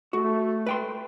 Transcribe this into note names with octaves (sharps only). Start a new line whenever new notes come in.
A3 F#4
B4 G5 C6